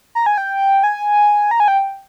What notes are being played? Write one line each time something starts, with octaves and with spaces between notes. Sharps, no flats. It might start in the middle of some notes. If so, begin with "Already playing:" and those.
A#5
G#5
G5
G#5
A#5
G#5
G5